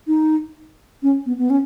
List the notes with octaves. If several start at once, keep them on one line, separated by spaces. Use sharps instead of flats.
D#4
C#4
B3
B3
C#4